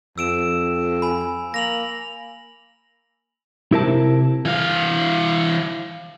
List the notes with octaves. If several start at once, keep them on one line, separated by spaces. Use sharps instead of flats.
F2 E6 D7 E7
G#5 B5
A#3 A#6 F7 F#7
C3 E4 A#4 A5
E3 F5